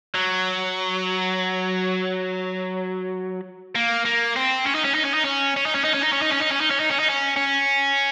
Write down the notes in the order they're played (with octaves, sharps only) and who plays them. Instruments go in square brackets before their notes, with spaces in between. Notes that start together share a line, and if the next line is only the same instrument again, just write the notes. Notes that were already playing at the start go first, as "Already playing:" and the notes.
[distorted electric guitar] F#3
A#3
A#3
C4
C#4
D#4
C#4
D#4
C#4
D#4
C#4
C#4
D#4
C#4
D#4
C#4
D#4
C#4
D#4
C#4
D#4
C#4
D#4
C#4
D#4
C#4
D#4
C#4
C#4